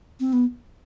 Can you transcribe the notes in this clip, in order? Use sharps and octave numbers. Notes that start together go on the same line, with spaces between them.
C4
B3